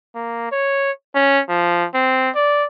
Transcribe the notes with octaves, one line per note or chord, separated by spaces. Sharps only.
A#3
C#5
C#4
F3
C4
D5